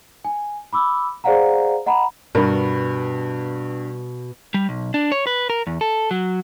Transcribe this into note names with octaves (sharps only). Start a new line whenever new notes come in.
G#5
B5 D6 E6
G#4 C5 D5 F5 F#5 A#5
D#5 F#5 A#5 B5
G2 B2 A#4 B5
G3
B1
D4
C#5
B4
A#4
E2
A4
F#3